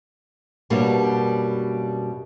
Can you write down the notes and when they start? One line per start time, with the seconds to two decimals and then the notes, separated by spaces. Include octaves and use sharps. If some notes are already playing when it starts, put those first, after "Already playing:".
0.70 F#2 B2 G3 A#3 D4